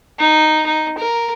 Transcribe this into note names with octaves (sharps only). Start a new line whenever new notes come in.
D#4
D#4
A#4